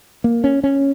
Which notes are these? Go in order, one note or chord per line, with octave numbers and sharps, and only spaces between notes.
A#3
C#4
C#4